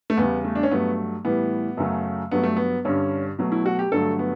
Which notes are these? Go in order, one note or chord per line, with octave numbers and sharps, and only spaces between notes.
A3
E2 C#3 G3 B3
A3
D4
C#4
G2 F#3 A3 B3
A2 E3 G3 B3
F#2 C#3 F#3 A3
G2 F#3 A3 B3
A3
B3
G2 D3 G3 C#4
B2 F#3 A3
E4
F#4
G4
G2 D3 F#3 A3 A4
B3